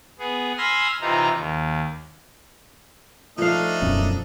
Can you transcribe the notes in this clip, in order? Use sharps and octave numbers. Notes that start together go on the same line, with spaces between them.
B3 G#4
G#5 B5 C6 E6 F6 A#6
C3 E3 D#4 F4 A#5
D#2
F3 A3 D4 D#4 A4 F5
E1 F#2 C#4